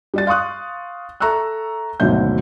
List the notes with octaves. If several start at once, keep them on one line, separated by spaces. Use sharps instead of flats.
G3 D5 A6
F5 C6 C#6 D#6 F#6
A4 E5 A#5 C#6 E6 F#6
G#1 D2 B2 F#3 E5 G6